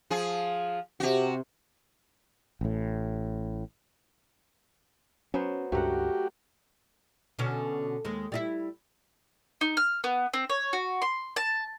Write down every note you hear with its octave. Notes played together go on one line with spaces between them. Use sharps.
F3 G#4
C3 F#4 G4
A1 A2
F#3 B3 C#4 C5
C#2 G2 A3 F#4 G4 A#4 F#5
B2 D3 C#4
D#2 G#3
G3 D#4 E4
D#4
F6
B3
C4
C#5
F#4
C6
A5